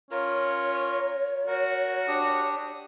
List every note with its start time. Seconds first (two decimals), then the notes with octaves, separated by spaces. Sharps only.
0.11 C#4 F4 A#4 C#5
1.47 F#4 A#4
2.08 D4 G4 D#6